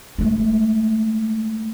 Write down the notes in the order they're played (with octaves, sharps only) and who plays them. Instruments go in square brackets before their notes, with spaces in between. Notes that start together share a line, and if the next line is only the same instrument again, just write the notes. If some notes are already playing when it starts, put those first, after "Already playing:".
[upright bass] G#3 A3